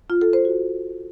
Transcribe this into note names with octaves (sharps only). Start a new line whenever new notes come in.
F4
A4
C5
F#4